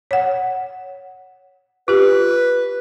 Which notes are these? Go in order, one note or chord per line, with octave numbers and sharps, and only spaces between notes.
C#5 F#5
F4 G4 B4